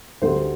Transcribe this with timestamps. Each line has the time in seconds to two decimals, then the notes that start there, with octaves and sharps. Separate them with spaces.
0.22 D2 D3 G3 C5